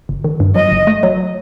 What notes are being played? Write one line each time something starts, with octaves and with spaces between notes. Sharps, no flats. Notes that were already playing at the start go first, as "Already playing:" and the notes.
G1
D#3
G2
F#3 D#5
G1
A3
F#3